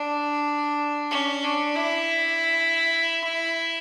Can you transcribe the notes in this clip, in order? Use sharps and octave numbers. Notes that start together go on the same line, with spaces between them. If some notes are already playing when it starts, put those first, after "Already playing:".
Already playing: D4
C#4
D4
E4